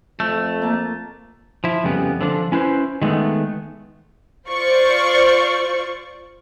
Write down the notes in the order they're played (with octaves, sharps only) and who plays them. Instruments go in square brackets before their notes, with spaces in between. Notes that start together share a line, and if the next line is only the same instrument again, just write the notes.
[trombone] F2 [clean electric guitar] A3
[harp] A#3 A5
[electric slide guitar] F3 E4
F2 C#3 G3 B3
D3 F3 D4
C#4 E4 B4 C5
D#3 G#3 A3 B3
[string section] F4 C5 D5 C#6